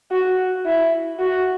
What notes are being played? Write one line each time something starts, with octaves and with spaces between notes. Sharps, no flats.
F#4
E4
F#4